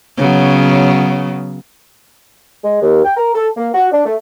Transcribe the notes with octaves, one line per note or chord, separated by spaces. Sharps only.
C#3 F#3 B3
G#3
D#2
G5
A#4
A4
A#3
F#4
D4
A3